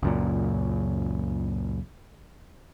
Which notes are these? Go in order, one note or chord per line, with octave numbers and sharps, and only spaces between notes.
C#2 F#2 A#2